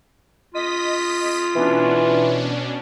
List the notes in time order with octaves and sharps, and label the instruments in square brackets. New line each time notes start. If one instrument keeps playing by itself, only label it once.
[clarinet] F4 [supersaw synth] D#5 D#6 B6
[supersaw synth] B2 C#4 D4 [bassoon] E3